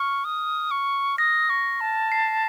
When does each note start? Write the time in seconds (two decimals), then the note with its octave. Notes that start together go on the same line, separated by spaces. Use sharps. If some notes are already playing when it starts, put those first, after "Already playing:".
Already playing: C#6 F6
0.25 D#6
0.71 C#6
1.18 D#6 A#6
1.50 C#6
1.81 A5
2.12 C7